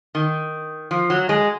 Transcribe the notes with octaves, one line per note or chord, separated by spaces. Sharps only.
D#3
F3
F#3
G#3